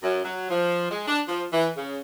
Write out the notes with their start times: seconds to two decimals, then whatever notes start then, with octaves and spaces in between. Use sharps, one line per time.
0.03 F#2
0.25 F#3
0.50 F3
0.91 G#3
1.07 D4
1.29 F3
1.51 E3
1.77 C#3